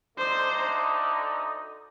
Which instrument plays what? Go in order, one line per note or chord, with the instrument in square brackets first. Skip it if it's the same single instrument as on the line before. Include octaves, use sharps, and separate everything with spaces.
[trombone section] D2 D3 A3 D#4 [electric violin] C5